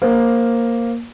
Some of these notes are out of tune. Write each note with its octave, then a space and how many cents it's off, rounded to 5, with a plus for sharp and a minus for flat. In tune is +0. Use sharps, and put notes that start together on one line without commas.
A#3 +0 C5 +0